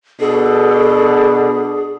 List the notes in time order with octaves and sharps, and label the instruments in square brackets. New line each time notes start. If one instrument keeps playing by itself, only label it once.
[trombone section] B2 D4 [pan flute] G#4 [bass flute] A4